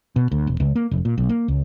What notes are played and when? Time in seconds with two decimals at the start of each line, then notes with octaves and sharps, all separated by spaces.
0.16 B2
0.32 D2
0.47 E1
0.60 C#2
0.76 A#3
0.91 F1
1.05 A#2
1.18 B1
1.29 A#3
1.48 C#2